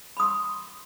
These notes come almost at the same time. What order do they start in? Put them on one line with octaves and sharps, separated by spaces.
B5 D#6 C6